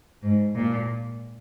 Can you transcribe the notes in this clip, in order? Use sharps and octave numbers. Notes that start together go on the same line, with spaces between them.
G#2
A#2